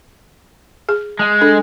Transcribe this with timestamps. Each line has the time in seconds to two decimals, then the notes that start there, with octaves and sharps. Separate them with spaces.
0.89 G#4
1.19 G#3
1.41 D4 A4